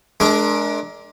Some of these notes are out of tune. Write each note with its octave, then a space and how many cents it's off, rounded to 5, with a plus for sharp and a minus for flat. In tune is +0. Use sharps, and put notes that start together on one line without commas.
G#3 +40 D4 +0 A#4 +10